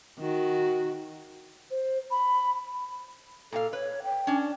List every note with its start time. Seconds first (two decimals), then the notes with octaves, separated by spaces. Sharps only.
0.19 D#3 F#4
1.71 C5
2.11 B5
3.52 A#2 F#4 A4 F5
3.73 B4 C#5
4.03 G5
4.27 C#4 D4